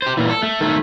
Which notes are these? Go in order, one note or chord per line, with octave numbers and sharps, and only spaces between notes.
G4 C5
A#2 E3
A4
A3
D#3 A3